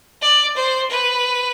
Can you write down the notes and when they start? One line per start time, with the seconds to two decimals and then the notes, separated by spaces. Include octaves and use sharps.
0.22 D5
0.56 C5
0.90 B4